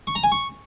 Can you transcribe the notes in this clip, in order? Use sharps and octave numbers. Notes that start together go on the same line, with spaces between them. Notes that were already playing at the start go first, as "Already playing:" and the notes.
C#6
A#5
G#5
C#6